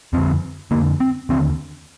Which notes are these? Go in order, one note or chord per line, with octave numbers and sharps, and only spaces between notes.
F2 D3 C4
F2 D3 A#3
C4
D#2 D3 C4